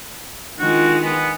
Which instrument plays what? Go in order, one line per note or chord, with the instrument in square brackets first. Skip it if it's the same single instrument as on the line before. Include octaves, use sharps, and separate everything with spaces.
[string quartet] D#3 G#3 [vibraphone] D4 F4 [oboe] F#4
[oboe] B3 [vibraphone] G#5